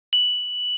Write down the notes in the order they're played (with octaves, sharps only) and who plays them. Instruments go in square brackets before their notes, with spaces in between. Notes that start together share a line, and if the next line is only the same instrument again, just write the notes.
[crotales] F#7